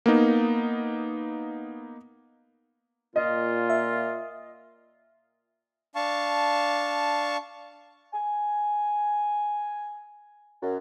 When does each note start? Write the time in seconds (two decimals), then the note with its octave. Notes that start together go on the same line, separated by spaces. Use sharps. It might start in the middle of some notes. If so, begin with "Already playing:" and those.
0.06 A#3 B3 D#4
3.16 A#2 F4 D#5
3.70 E5
5.95 D4 F5 A5 C#6
8.13 G#5
10.62 F#2